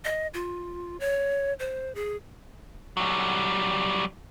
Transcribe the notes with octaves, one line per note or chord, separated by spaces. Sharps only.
D#5
F4
C#5
C5
G#4
F#3 G3